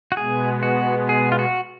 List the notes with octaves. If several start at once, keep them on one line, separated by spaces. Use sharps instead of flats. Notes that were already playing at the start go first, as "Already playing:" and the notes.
F#4
B2 G#3 B3 G#4
F#4
G#4
F4
F#4